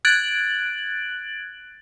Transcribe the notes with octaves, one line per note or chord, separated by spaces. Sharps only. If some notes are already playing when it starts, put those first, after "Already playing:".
F#6 G#6 A6 D7 F#7